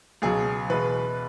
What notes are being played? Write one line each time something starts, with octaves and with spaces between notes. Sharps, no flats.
C#2 B2 F#3 G#4
E2 B2 G#3 B4